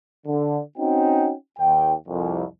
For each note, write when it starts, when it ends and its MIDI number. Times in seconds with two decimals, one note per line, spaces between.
0.27 0.59 50
0.78 1.33 60
0.78 1.33 61
0.78 1.33 63
0.78 1.33 66
0.78 1.33 78
0.78 1.33 79
1.58 1.93 39
1.58 1.93 79
2.08 2.44 36
2.08 2.44 41